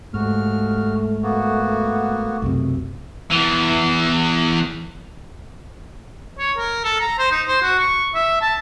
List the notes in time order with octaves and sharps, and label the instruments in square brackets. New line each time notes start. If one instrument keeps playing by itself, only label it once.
[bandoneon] D#2 F#4 F6 [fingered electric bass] G#2 [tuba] A3
[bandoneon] A#3 B3 F#4
[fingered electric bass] B1 F#2 C3
[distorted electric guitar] E2 E3
[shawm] C#5
A#4
A4
A#5
C5
D#4
C5
F#4
C#6
E5
A5